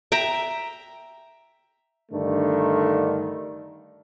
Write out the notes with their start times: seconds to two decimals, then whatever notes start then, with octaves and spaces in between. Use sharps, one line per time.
0.12 E5 G5 A#5
2.12 G2 D3 D#3 A3